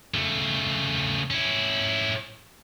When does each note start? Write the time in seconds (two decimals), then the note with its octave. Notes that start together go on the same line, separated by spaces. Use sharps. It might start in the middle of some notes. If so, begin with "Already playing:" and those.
0.14 C#3 A3
1.30 C#4 E4